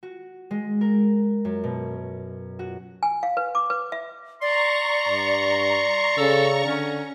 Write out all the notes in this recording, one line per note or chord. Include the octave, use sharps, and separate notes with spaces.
F#4
G#3
A#4
F#2
B2
F#4
G#5
F5
B4
D6
B4
E5
D5 A#5 C6 C#6
G2
C#3 A4
D3 C#4